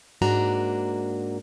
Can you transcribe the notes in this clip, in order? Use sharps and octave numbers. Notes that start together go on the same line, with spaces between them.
G#2 A#3 D4 F#4 A#5